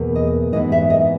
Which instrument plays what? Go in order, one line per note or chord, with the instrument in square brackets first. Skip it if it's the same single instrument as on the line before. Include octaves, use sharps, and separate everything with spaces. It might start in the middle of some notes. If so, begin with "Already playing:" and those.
Already playing: [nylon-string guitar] E2 B2 A#3
D#5
G#2 E3 B3 D#5
E5
D#5